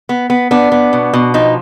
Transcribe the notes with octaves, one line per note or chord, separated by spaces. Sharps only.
B3
B3
B3 D4
B3
B2
B2
F3 D#4